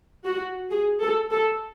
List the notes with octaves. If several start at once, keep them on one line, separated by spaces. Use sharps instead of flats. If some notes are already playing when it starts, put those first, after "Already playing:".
F#4
G#4
A4
A4